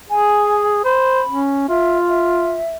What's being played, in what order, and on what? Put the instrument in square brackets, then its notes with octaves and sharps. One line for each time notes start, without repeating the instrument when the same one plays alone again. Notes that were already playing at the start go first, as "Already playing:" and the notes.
[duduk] G#4 [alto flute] G#5
[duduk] C5 [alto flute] B5
[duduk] C#4
[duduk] F4 [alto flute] E5
[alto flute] E5